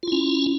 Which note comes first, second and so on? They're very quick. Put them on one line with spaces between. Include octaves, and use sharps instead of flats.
F4 E4 C#4